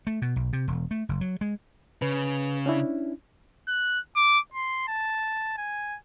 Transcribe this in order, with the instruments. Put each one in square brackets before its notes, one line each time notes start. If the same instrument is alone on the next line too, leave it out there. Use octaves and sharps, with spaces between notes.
[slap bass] A3
B2
B1
C3
E1
A3
F#1
F#3
G#3
[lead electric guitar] C#3 [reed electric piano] B4
[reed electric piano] C#4 D4 E4
[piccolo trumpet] F#6
D6
C6
A5
G#5